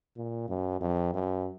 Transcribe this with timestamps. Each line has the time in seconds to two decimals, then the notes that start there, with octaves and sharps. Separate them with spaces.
0.17 A#2
0.49 F#2
0.81 F2
1.14 F#2